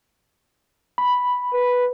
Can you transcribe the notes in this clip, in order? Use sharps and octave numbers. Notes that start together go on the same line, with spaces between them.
B5
B4